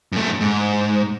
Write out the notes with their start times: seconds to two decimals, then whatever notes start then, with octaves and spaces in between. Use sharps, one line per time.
0.12 F#2 A3
0.41 G#2